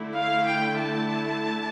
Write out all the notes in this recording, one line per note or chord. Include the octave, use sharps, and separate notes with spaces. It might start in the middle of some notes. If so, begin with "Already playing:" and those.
Already playing: D3 A3 E4
F5
G5
A5